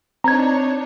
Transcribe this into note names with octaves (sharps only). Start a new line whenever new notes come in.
C4 D4 D#4 C#5 A#5 G#6